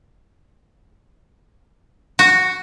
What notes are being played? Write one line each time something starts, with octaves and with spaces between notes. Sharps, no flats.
F#4